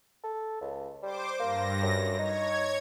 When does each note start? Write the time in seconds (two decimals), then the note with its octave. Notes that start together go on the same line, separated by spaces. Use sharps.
0.24 A4
0.61 C#2
1.03 G3 C5 D6
1.39 G2 A#3 A#6
1.82 F#2
2.19 D#4 C#5 G#6